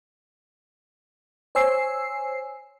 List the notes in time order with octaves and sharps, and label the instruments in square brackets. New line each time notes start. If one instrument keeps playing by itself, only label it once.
[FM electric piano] C5 C#5 G#5 E6 C7